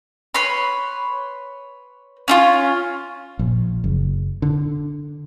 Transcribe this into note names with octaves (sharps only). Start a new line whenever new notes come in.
B4 C#5 B5 C6
C#4 D4 F4
A#1
F#1
D3